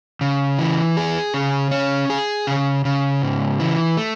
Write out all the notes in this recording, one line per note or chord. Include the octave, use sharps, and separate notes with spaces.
C#3
E3
G#4
C#3
C#4
G#4
C#3
C#3
G#2
E3
A3